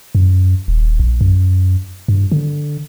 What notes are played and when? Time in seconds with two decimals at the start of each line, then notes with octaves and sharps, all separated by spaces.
0.15 F#2
0.68 D#1
0.99 A#1
1.21 F#2
2.08 G2
2.32 D3